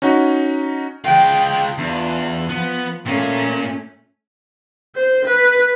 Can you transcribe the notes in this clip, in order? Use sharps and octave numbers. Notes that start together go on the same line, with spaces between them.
C#4 D#4 F#4
G#3 F4 G5
E2 D4 F4
F3 B3
A#2 A3 A#3 C#4
C5
B4